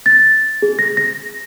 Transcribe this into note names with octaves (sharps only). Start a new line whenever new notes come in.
A6
G#4
A#6
A#6